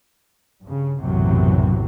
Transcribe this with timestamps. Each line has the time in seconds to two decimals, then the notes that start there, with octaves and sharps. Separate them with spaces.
0.62 G2 C#3
1.00 B1 F#2 A2 C3 E3 F#3